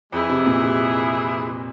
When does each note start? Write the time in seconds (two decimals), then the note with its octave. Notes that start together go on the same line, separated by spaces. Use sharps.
0.12 F2 E3 G#3 E4 G#4
0.29 C3
0.46 A#2
0.64 C3